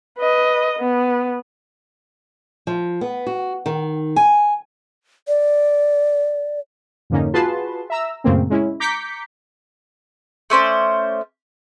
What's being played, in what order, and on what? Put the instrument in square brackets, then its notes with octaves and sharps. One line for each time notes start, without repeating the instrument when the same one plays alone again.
[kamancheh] B4 D#5
B3
[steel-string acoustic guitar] F3
B3
F#4
D#3
G#5
[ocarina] D5
[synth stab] F2 G#2 D3 A#3 C#4 D#4
F4 F#4 G#4 B4 A5 C6
E5 A#5 E6
F#2 A#2 C#3 A3 A#3 C4
G#3 C#4 E4
A#5 D6 G6 B6 C#7
[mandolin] A3 C#4 C5 D5